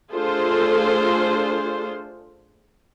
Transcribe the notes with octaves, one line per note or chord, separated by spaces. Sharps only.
A3 D4 F4 G#4 A4 C5